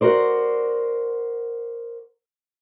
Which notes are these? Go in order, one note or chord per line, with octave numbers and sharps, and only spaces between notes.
F#4 A#4 C5 D5